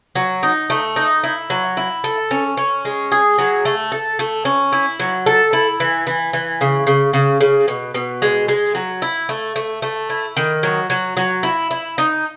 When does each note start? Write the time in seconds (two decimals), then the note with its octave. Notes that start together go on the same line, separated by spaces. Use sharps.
0.15 F#3
0.43 D#4
0.70 A3
0.96 D#4
1.23 E4
1.50 F#3
1.77 E4
2.04 A4
2.31 C#4
2.57 C#4
2.85 G#3
3.12 G#4
3.38 F#3
3.65 A3
3.92 A4
4.19 A3
4.45 C#4
4.72 E4
5.00 F#3
5.26 A4
5.53 E4
5.80 E3
6.07 E3
6.33 E3
6.61 C#3
6.87 C#3
7.13 C#3
7.41 C#3
7.68 B2
7.94 B2
8.22 G#3
8.48 G#3
8.75 F#3
9.02 E4
9.29 A3
9.56 A3
9.82 A3
10.10 E4
10.37 D#3
10.63 F#3
10.90 F#3
11.17 F#3
11.43 E4
11.71 E4
11.98 D#4